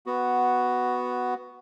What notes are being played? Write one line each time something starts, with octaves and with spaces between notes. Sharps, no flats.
B3 F#4